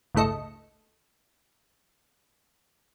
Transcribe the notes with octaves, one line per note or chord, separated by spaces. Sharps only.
G1 C#2 A2 A4 D#5 C#7